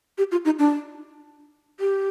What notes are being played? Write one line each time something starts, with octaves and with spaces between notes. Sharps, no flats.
G4
F4
D#4
D4
G4